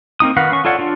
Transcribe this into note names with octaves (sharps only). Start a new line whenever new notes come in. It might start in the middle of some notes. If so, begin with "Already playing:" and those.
A#3 C4 D#4 D#6
D#3 F#4 B4 F5 F#5
C#4 C#6
F4 A4 C#5 D5 F#5
D4 F4